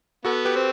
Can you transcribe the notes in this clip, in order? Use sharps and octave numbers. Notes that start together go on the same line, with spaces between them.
B3 F#4 A4
G4 B4
C4